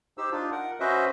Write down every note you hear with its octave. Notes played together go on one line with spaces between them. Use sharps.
D#4 G4 C5 E6
D4 D#4 F4
A#4 F#5
C#4 F#4 B4 C5 D#5 E5